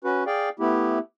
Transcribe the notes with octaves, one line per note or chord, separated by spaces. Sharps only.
C#4 F#4 B4
G#4 D5 F5 G5
A3 B3 E4 G4